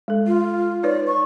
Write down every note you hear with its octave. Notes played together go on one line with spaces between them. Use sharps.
G#3 A4
F4
D#4 B4 C#5 D5
C#6